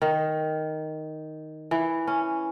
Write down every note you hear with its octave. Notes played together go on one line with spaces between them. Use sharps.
D#3
E3
C#4